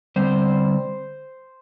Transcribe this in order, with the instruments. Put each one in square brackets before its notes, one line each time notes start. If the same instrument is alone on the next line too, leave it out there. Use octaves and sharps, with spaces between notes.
[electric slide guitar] D3 G3 C4 C5